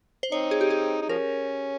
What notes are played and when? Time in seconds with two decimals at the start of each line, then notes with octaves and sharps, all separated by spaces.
0.23 C5
0.32 C4 D#4 C#5
0.51 G#4
0.61 G4
0.70 G#4
1.01 D#4
1.09 F3 C#4 A#4